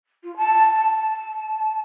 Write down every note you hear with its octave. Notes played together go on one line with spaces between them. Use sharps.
F4
A5
A5